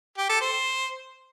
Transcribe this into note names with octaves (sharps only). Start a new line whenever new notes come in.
G4
A4
C5